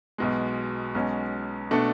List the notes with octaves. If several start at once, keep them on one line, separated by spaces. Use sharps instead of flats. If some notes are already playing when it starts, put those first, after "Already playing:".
B1 B2 G#3
B1 B2 G#3 C#4
B2 A3 D4 A4